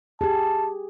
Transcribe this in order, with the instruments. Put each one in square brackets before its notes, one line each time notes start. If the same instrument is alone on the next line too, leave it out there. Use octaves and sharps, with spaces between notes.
[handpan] G4 G#4 [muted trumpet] A5